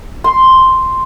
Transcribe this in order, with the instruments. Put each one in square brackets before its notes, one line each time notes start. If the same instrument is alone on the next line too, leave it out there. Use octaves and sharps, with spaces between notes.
[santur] C6